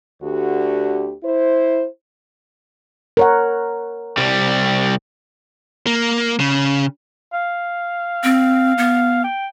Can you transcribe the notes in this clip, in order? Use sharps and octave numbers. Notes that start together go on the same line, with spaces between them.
D2 D3 F#4 G4
E4 C5
A#4 C#5 F#5
C2 G3
A#3
C#3
F5
C4
B3
G5